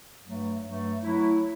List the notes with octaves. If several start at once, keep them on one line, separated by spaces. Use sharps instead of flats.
G2 F#3 A3
G2 F#3 A3
F#3 A3 E4